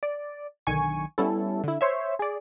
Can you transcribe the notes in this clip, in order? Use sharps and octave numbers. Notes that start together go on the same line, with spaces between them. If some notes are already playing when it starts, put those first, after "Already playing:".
D5
B1 D3 D#3 G#5 C#6
G3 B3 C#4 E4 A4
D3 E4
C5 C#5 E5
G#4 D5